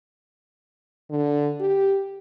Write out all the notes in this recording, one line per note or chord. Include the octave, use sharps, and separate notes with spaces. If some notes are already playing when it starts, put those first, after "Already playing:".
D3
G4